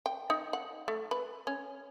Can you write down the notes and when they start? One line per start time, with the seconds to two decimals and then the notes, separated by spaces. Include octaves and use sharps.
0.06 G5
0.30 D#4
0.53 F#5
0.88 A3
1.11 B4
1.47 C#4